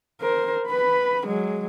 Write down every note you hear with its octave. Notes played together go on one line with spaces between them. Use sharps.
A#4 C5
B4 B5
F#3 G#3